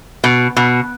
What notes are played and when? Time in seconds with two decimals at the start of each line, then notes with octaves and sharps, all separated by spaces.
0.24 B2
0.57 B2